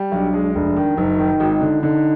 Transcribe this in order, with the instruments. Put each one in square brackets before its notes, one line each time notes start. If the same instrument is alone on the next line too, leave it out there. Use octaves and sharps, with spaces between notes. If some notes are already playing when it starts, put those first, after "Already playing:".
Already playing: [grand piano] G3
[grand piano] B1 [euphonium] D4
[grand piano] G#3
[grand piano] F1 [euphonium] D4
[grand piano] D#3
[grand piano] F#1 [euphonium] D#4
[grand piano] D#3
G#1
D3
[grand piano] D3 [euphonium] D#4